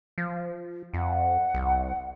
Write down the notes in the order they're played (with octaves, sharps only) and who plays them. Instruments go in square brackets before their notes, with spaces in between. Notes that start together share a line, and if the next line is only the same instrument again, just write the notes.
[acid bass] F3
[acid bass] F2 [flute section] F#5
[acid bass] C2